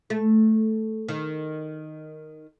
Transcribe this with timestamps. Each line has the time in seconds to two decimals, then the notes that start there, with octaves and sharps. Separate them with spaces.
0.10 A3
1.08 D#3